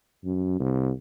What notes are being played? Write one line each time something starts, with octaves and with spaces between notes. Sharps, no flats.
F#2
C2